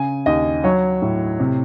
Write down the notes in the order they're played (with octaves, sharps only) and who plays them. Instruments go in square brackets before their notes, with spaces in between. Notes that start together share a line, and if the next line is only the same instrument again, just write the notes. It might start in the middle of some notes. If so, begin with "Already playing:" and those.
Already playing: [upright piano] C#3 G#5
D#2 D#5
F#3 C#5
A2
C3